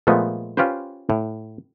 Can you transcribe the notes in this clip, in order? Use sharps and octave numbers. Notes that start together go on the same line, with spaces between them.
A#2 F3 G#3 A3 B3
C#4 F4 G4 B4 C5
A2